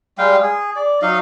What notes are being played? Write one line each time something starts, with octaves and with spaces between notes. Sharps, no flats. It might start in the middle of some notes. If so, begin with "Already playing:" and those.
G3 G#3 F5 G5
G#4
D5
F#3 D#4 D#5 F5